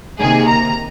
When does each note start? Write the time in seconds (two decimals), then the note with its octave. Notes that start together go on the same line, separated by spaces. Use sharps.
0.19 C3 D#3 A#3 G#4
0.48 A#5